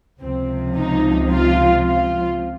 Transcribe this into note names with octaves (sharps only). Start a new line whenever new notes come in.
C#2 C3 F3 C4
D#4
F4
F4